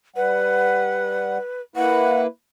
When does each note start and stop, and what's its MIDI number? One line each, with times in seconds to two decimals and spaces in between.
0.16 1.38 55
0.16 1.61 71
0.16 1.38 78
1.76 2.27 58
1.76 2.27 64
1.76 2.27 71
1.76 2.21 78